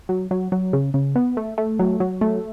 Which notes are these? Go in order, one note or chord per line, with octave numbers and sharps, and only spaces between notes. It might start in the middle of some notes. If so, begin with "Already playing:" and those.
F#3
F#3
F#3
C#3
C#3
B3
A3
A3
F#3
F#3
A3